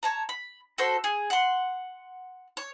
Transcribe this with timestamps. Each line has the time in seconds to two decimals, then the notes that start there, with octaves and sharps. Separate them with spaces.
0.03 C#5 A5 A#5
0.29 B5
0.78 F#4 A4 C5
1.04 G#4
1.30 F#5 C6
2.57 C#5